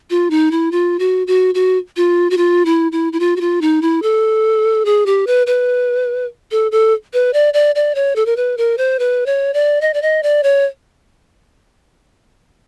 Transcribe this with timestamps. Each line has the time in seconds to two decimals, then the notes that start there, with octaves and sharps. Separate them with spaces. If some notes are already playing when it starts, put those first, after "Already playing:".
0.10 F4
0.30 D#4
0.51 E4
0.72 F4
0.99 F#4
1.27 F#4
1.55 F#4
1.97 F4
2.30 F#4
2.37 F4
2.65 E4
2.92 E4
3.13 E4
3.20 F4
3.36 F#4
3.41 F4
3.61 D#4
3.82 E4
4.02 A4
4.85 G#4
5.06 G4
5.27 B4
5.47 B4
6.51 A4
6.72 A4
7.13 B4
7.33 D5
7.54 D5
7.75 D5
7.95 C#5
8.16 A4
8.26 A#4
8.37 B4
8.57 A#4
8.78 C5
8.99 B4
9.26 C#5
9.54 D5
9.81 D#5
9.94 D5
10.02 D#5
10.23 D5
10.43 C#5